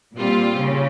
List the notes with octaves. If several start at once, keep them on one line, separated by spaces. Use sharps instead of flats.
A#2 G3 C4 F4
C#3